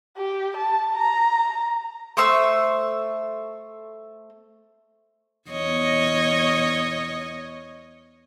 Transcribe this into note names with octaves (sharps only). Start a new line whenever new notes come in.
G4
A5
A#5
A3 C5 C#6 E6
E2 C#5 D#5